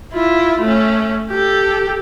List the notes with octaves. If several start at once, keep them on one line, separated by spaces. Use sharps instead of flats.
E4 F4
A3 C#4
G4 A4